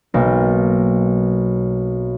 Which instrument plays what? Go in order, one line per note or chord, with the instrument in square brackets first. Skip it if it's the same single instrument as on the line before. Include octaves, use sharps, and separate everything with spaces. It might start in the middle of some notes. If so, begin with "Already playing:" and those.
[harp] B1 A#3